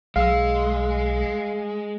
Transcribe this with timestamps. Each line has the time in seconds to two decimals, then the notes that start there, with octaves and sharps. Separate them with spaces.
0.16 B1 G#3 F5 E6